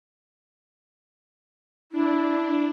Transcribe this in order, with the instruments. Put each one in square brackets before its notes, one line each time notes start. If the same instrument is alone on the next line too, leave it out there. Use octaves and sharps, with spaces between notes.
[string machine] D4 [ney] E4